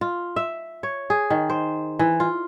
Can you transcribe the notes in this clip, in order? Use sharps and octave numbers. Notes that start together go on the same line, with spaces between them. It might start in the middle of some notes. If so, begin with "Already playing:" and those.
F4
E5
C#5
G#4
D#3
C5
E3
F4